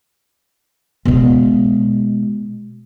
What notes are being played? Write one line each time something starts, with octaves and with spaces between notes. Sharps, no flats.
B2 G#3